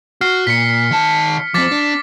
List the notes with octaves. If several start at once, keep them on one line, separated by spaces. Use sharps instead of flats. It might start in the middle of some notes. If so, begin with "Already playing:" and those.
F#4 F6 C7
A#2 B6 C#7
D#3 A5
F3 C4 D6 A6 B6
D4